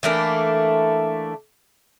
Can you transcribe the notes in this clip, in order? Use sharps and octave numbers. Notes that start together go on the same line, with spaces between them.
E3 A3 A#3 D4